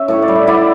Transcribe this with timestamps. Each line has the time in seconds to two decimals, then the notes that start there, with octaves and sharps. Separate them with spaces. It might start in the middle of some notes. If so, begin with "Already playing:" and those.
Already playing: C#4 E5
0.08 A2 C#5
0.22 D5
0.28 G3
0.35 E5
0.47 E4 D5 F#5